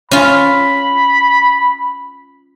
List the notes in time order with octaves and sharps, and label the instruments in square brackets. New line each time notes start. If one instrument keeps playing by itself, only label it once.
[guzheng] C#4 F4 [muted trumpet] B5